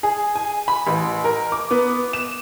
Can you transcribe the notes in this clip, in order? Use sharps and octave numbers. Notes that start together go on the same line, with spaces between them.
G#4
G#5
B5
A1
A#4
D6
B3
E7